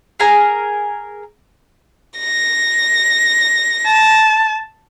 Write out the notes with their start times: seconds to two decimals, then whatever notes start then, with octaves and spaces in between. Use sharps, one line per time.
0.20 G#4 A#4 G#5 A#5
2.18 A#6
3.87 A5